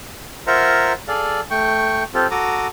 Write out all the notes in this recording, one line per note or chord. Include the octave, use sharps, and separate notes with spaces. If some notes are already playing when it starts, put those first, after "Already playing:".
F4 A#4 C5 E5 F#5 A#5
G#4 A4 D5 F5
A3 G5 C#6
C4 F4 G4 A4
F#4 A4 A#5 D6 D#6